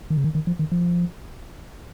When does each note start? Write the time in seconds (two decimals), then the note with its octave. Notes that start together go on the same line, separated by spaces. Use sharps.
0.10 D#3
0.17 C#3
0.24 D#3
0.35 D#3
0.47 F3
0.59 D#3
0.72 F3